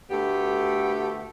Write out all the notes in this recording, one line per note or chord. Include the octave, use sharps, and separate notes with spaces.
D2 A3 B3 G4